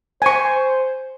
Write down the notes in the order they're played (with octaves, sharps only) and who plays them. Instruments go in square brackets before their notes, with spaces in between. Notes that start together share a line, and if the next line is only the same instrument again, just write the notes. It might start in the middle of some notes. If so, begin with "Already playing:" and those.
[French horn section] C5 [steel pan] G#5 C#6